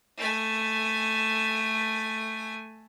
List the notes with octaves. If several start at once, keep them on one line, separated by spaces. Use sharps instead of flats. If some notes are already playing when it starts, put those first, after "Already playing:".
A3 G#5